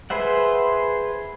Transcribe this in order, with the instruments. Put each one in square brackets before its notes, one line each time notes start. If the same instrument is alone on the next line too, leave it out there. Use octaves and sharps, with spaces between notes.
[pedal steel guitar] G#4 B4 C5 E5 F#5